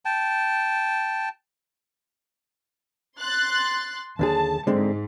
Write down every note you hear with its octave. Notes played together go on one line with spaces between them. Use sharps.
G5 A5
C6 F#6 A6
D#2 D3 G#4 A5
G#2 D3 G#3 C4